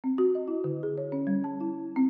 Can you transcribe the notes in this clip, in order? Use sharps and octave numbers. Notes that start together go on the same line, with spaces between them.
C4
F#4
D#5
E4
D3
G#4
C#5
C#4
G3
A5
E4
C4